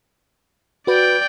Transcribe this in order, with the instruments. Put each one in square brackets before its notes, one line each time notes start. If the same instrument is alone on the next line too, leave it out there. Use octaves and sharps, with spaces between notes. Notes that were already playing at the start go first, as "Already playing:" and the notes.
[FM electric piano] F#4 B4 [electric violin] D5 G5